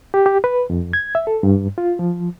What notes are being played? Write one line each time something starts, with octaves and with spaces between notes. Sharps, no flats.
G4
G4
B4
F2
G#6
E5
A4
G2
F4
F3